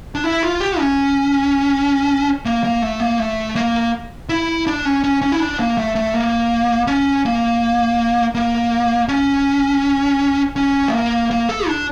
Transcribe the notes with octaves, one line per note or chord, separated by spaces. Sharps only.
D4
E4
F4
G4
C#4
A#3
A#3
A3
A#3
A3
A#3
E4
D4
C#4
C#4
C#4
E4
D4
A#3
A3
A3
A#3
C#4
A#3
A#3
C#4
C#4
A3
A#3
A#3
A4
D4